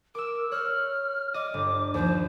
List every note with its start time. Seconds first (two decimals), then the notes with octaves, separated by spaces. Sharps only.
0.15 A#4 D6 E6
0.51 C#5 F6 F#6
1.34 D#5 D6
1.54 G1
1.94 D#2 F3 C5